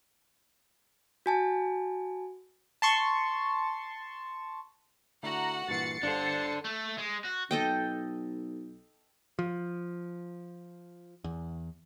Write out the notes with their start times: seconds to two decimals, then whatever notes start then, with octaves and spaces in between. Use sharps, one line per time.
1.26 F#4 G#5 A5
2.82 A5 C6 C#6
5.23 D3 A3 E4 F#4 F#5 A#5
5.68 G2 A#2 E3 A6 C7 C#7
6.03 G1 D4 A4 C5 F5
6.65 A3
6.98 G#3
7.25 F#4
7.51 B1 A4 D#5 G5
9.39 F3
11.24 E2